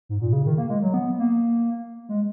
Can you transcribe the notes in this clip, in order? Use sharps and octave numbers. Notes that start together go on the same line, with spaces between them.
G#2
A#2
C#3
D#3
A#3
G#3
F#3
B3
A#3
G#3